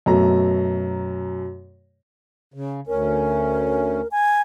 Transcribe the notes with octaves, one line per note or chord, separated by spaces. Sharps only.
F#2 B2 A3 A#5
C#3
D2 C#4 A#4
G#5